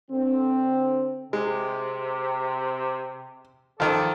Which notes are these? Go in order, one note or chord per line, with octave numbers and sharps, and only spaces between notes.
D3 C4
C3 G#3
D#3 F3 A4 D5